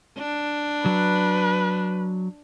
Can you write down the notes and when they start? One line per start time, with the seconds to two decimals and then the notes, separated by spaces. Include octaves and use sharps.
0.18 D4
0.86 F#3 B4